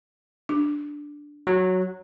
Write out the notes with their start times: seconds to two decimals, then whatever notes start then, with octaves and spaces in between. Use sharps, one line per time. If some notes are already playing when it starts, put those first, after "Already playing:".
0.49 D4
1.47 F#3